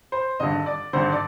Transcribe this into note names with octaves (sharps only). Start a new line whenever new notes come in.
C5
G#1 G2 D3 D#5
D5
G#1 G2 D3 C5
D5